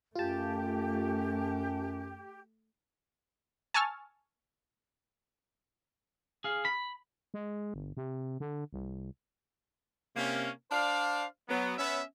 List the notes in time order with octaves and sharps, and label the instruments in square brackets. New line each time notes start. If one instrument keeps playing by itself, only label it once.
[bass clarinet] F#2 [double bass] A3 [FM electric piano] F4 A5 [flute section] G4
[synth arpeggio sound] G#5 A5 C#6 E6 F6 A6
[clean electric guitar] G#4 F5
B5
[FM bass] G#3
G1
C3
D3
C2
[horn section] C3 A#3 C#4
D4 C5 D5 F5
F#3 B3
B3 C#4 E5